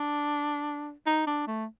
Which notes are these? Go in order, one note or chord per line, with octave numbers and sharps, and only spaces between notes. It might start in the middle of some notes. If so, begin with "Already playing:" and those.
Already playing: D4
D#4
D4
A3